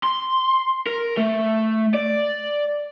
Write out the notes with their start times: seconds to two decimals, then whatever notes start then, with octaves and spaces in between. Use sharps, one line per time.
0.03 C6
0.87 A#4
1.17 A3
1.94 D5